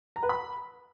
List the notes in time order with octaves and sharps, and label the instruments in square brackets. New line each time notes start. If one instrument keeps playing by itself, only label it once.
[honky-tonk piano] A#5
B4
B5